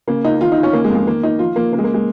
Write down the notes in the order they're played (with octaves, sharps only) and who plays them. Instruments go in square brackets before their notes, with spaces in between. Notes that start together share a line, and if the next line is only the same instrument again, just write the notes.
[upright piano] C#3 A#3
C#2 D#4
D#3 F4
D#4
D#3
C#4
C#3 A#3
G#3
F2
G#3
D#3 A#3
D#3 D#4
F3 F4
F3 A#3
C#3 A#3
G#3
A#3
G#3